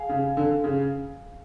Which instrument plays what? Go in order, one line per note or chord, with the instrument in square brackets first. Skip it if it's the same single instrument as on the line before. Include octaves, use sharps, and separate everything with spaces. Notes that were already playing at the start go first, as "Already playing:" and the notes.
Already playing: [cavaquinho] G#4 F5
[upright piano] C#3
D3
C#3